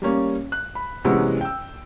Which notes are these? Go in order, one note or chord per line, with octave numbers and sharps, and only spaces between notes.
G3 A#3 C#4
F#6
B5
C3 E3 F#3 G#3 B3 C#4
G5 E6